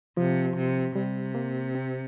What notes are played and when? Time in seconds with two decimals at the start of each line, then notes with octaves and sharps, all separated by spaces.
0.17 C3 F3
0.57 C3
0.95 C3 G3
1.35 A#3
1.75 C4